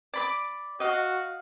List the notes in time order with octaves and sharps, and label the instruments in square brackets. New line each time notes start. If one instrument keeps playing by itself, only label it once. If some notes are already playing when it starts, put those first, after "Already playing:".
[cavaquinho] D5 B5 D6
[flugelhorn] F#4 [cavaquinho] D#5 F5